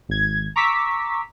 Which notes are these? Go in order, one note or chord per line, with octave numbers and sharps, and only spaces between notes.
G#1 G#6
A#5 C#6 D6 E6 B6